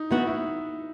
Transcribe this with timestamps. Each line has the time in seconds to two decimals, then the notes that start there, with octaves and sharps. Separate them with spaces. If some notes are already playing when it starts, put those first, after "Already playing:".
Already playing: D#4
0.11 E3 B3 D#4 F#4
0.27 E4